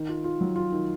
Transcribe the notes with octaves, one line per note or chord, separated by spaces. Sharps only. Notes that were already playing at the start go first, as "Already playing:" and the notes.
Already playing: D#3
F4
F4
F#3
F4
D#3